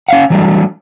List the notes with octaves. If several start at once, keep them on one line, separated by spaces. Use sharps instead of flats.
C#4 C#5 F5 F#5
E3 F#3 G3 A3 D4